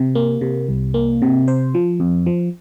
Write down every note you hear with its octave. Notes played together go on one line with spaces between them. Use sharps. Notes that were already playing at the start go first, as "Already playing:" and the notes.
Already playing: C3
A#3
C3
C2
A#3
C3
C5
F3
F2
F3